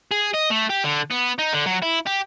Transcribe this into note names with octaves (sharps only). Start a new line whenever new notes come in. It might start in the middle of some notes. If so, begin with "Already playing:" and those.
G#4
D#5
A3
G4
D3
B3
D#4
D3
F#3
E4
G4